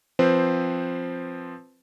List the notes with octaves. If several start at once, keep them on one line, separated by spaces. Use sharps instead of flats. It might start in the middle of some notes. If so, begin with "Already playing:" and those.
F3 C4 B4 C5